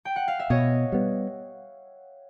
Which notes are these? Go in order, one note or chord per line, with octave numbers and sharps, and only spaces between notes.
G5
F#5
F5
E5
B2 C#5 D#5
G3 B3